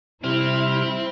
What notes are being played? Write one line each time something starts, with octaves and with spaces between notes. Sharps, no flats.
C3 G3 C4 E4 F6